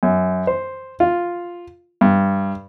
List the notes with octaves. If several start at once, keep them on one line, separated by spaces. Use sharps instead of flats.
F#2
C5
F4
G2